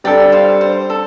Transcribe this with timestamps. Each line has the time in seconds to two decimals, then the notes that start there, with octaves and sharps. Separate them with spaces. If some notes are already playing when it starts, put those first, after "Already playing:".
0.04 G3 D4 A4 D5 G5
0.32 C5 F5
0.61 C5
0.90 A4